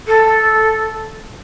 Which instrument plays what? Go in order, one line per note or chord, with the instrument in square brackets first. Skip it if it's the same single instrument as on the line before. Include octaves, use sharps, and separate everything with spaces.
[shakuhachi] A4